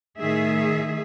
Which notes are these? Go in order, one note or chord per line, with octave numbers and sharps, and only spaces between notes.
A2 D#3 G#4 E5